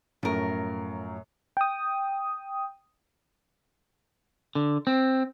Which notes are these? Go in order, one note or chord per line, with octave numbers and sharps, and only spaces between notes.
F#2 A2 F3 A#4
G5 D#6
D3
C4